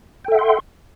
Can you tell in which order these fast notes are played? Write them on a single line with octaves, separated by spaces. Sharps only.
G5 A4 E5 F#5 C6